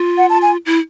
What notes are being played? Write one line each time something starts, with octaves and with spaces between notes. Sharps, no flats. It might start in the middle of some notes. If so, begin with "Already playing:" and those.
Already playing: F4
F#5
A5
G#5
E4